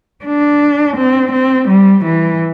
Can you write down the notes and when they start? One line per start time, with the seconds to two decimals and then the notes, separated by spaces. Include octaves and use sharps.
0.25 D4
0.97 C4
1.32 C4
1.69 G3
2.05 E3